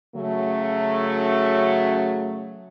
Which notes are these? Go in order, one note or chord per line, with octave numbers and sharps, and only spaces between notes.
C#3 F#3 A3